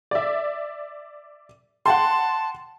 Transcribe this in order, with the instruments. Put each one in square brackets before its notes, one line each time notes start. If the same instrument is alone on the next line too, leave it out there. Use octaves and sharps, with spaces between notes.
[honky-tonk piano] D5 E5
[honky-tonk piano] F#5 G5 C6 [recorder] A5